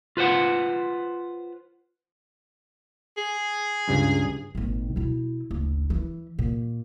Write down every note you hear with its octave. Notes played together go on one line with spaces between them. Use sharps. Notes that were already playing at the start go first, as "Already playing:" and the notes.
F4 B4 C5 F#5
G#4
C#2 G2 C#3
G#1 A#2
B2 E4
F#1 D2
E3
A#2